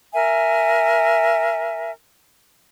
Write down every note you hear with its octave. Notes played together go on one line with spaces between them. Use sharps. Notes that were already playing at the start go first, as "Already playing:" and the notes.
A#4 E5 G#5